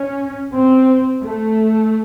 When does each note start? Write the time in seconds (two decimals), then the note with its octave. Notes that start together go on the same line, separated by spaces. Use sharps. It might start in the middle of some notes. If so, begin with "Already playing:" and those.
Already playing: C#4
0.54 C4
1.22 A3